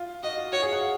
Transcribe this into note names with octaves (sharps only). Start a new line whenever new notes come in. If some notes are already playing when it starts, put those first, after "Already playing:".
Already playing: F4
F#4 D#5
F4
F#4 C#5
G#4
F#5
F5